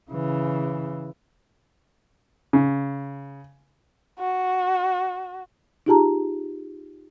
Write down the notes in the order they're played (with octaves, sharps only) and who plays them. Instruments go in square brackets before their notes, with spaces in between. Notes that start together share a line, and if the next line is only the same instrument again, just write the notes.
[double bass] C#3 E3
[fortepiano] C#3
[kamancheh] F#4
[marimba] D#4 F4 G4 G#4 A5 A#5